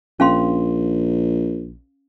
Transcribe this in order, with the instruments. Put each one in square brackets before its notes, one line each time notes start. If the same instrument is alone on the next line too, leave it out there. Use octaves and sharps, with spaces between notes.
[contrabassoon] A#1 [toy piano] C#4 F5 C6